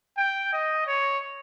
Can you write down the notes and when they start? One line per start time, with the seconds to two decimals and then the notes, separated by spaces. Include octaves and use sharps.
0.17 G5
0.53 D#5
0.87 C#5